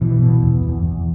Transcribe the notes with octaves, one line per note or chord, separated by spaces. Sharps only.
B2 E3
B2
E2
E2
E2